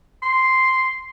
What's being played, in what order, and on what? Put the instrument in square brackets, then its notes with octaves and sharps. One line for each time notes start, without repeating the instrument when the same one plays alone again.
[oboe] C6